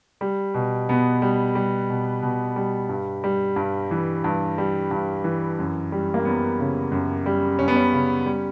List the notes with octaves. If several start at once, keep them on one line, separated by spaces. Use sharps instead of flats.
G3
B2
B2 B3
G3
G3
B2
B2
G3
G2
G3
G2
E3
G2
G3
G2
E3
F#2
G3
A#3
F#2 B3
C#3
F#2
G3
F#2 C#4
B3
C#4
C#3
G3